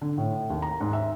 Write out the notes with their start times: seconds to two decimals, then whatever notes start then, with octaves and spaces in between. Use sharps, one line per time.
0.01 D3
0.18 A2
0.50 D#2
0.62 A#5
0.81 G#2
0.93 E5